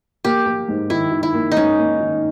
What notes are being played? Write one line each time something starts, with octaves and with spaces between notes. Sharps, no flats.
A#3 G4
A#3
G#2
D#3 E4
D#3
E4
A#3
D#4
G#2 C#4
A#3
D#3